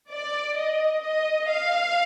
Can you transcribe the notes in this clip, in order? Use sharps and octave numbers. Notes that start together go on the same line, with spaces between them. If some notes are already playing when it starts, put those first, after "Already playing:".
D5
D#5
D#5
F5